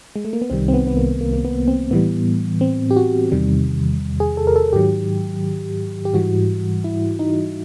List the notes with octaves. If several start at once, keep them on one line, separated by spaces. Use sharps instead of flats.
G#3
A3
A#3
B3
C2 C3 D#3 G3 C4
C4
B3
B3
A#3
A#3
A#3
B3
C4
A2 E3 G3 B3
C4
G4
F#4
E2 C3 D#3 G3
G#4
A4
A#4
A4
G#2 D#3 F#3 G4
G4
G#2 E3 G3 F#4
E4
D#4